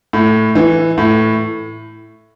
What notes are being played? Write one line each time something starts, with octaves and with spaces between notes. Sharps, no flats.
A2
E3
A2